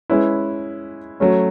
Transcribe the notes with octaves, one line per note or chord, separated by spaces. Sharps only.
G#3 C#4 E4 B4
F#3 A3 C#4